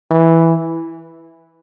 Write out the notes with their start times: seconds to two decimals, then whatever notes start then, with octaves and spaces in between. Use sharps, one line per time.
0.11 E3